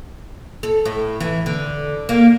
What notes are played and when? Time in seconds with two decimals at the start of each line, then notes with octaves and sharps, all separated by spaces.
0.63 A4
0.85 A2
1.20 E3
1.46 D3
2.09 A#3